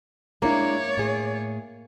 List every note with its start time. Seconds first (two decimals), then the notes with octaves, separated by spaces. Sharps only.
0.42 G#3 A#3 D4 E4 C#5 D5
0.97 A2 G#4